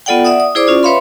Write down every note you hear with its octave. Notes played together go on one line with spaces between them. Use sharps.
B3 F4 A4 D5 F#5 G5
D5 E5 F#5 D#6
D#6
E4 G#4 C5 D5 D6 D#6
C#4 F4 D5
B4 C#5 E5 F5 B5 C6